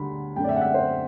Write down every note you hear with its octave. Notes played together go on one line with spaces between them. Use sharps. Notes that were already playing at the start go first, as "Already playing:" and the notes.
Already playing: D2 D3 G3 B5
F#2 D3 A3 C4 G5
D5
E5
F#5
E5
C5